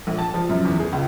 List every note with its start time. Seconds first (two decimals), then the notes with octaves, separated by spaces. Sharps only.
0.07 A#1
0.19 A5
0.34 F3
0.50 F#2
0.65 E2
0.79 G#4
0.92 C#2